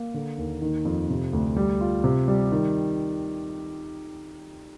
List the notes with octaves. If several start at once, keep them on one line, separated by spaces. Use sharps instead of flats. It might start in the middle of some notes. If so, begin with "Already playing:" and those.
Already playing: A#3
D3
D#2
D#3
F2
C3
D2
G3
F4
C3
G3
D#3